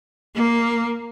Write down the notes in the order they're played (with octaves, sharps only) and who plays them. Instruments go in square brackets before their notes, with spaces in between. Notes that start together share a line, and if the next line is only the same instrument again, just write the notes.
[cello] A#3